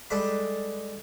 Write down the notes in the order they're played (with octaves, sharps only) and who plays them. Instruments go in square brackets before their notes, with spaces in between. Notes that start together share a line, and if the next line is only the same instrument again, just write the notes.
[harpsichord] G3 G#3 A4 B4 D5 B5